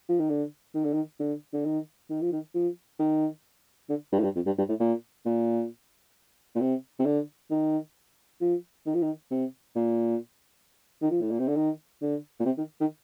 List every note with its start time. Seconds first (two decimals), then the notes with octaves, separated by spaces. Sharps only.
0.09 F3
0.19 D#3
0.30 D3
0.75 D#3
0.85 D3
0.93 D#3
1.19 D3
1.53 D3
1.65 D#3
2.10 D#3
2.21 F3
2.32 D#3
2.55 F3
2.99 D#3
3.90 D3
4.13 G2
4.20 A2
4.24 G2
4.35 F2
4.46 G2
4.58 G2
4.69 A2
4.80 A#2
5.26 A#2
6.55 A#2
6.61 C3
6.99 C3
7.06 D3
7.51 D#3
8.41 F3
8.86 D#3
8.94 F3
9.02 D#3
9.31 C3
9.76 A#2
11.02 D#3
11.11 F3
11.21 A2
11.31 A#2
11.39 C3
11.48 D3
11.56 D#3
12.02 D3
12.40 A#2
12.46 C3
12.58 D#3
12.81 D#3